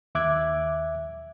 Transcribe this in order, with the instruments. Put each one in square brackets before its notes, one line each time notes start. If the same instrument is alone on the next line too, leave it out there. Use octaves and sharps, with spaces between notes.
[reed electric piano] D#2 E5 D6 F#6 G#6